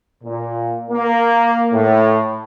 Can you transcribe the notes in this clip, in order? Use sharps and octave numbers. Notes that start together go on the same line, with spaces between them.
A#2
A#3
A2